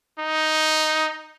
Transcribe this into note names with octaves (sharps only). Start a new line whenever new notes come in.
D#4